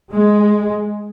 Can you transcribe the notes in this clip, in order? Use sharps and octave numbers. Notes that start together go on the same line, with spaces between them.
G#3